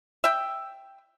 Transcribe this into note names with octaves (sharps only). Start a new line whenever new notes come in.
E5 G5